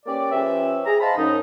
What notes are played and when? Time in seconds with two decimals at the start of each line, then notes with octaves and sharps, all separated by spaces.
0.06 A#3 C#4 G4 B4 D5
0.32 F3 C#4 G4 B4 E5
0.86 G#4 A#5
1.00 C5 D#5 F5 A5 B5
1.16 F#2 D#4